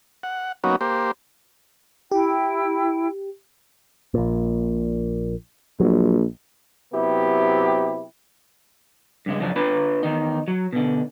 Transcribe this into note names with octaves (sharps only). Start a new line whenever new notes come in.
F#5
F#3 A#3 B3 C#4 D#4 F#4
A#3 G4 C5
E4 G4 G5
A#1 A#2
A#1 F#3
C3 F#3 B3 E4 G4
G2 C#3 G#3
F#2 C#3 F3 D4
D4 F4 B4 B5
E2 D#3 D#4
F#3
B2 D3